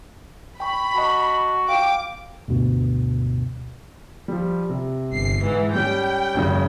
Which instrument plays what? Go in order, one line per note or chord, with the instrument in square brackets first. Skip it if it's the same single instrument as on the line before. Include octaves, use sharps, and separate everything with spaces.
[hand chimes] G5 C#6 [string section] B5
[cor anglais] F#4 [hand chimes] D#5 A5
[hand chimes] F4 F5 [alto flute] G5 [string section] D6
[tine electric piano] D2 G2 B2
[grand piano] F3 G3
C3
[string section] G1 C7
G#2 E3
[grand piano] G3 C#4 [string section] G5
[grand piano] G#1 F#2 C#3